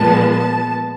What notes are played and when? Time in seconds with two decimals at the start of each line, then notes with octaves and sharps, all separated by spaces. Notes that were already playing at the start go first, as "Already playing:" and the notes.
Already playing: A#2 F3 G#3 B3 A5
0.33 A5